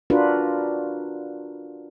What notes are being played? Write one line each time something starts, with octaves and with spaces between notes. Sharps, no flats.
D4 F4 F#4 A#4 B4